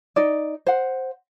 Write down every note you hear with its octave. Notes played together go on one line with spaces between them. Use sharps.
D#4 D5
C5 F#5